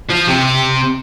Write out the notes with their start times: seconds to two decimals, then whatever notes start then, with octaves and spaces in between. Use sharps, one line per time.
0.09 F3
0.28 C3